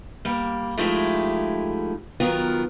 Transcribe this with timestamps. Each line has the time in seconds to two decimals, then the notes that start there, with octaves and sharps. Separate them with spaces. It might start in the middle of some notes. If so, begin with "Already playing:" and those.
0.25 G3 A#3
0.77 F3 G#3 A3 D#4 E4 G4
2.20 D#3 F#3 B3 F4 A#4